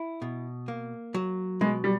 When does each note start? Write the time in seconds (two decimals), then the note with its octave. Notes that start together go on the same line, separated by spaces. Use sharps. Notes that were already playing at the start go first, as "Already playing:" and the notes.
Already playing: E4
0.22 B2
0.68 A#3
1.14 F#3
1.61 B2 G#3
1.84 G3